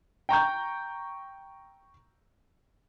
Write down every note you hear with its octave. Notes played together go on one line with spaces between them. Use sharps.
G5 A#5 C#6 G6